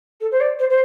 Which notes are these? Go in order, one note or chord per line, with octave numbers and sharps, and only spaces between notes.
A4
C5
D5
C5
C5